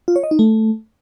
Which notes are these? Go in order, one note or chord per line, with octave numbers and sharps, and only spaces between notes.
F4
C#5
D#5
D#4
A3